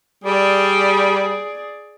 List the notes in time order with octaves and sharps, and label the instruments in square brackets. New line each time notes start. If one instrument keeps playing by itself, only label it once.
[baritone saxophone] G3 [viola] G#4 D5